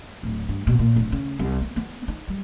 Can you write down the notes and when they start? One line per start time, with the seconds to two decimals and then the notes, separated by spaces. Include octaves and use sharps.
0.23 D1
0.49 G2
0.67 B2
0.79 A#2
0.96 D1
1.12 C#3
1.39 C2
1.61 B3
1.76 B3
2.08 D#4
2.28 G3